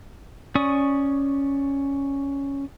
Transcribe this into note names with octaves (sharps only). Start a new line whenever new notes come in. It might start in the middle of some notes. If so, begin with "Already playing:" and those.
C#4 D5 C#6 D#6